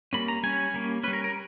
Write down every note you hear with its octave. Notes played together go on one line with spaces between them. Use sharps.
G3 A#3 C#4 B5
A#5
G3 C#4 G#5
G3 A#3 C#4
G3 C#4 B4
A#4
A#4